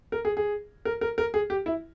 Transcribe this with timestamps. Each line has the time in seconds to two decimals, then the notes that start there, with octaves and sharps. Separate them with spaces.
0.12 A#4
0.25 G#4
0.37 G#4
0.85 A#4
1.01 A#4
1.18 A#4
1.34 G#4
1.50 G4
1.66 E4